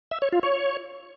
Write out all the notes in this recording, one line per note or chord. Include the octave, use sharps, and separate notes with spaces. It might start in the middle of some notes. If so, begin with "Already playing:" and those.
E5
C#5
F4
C#5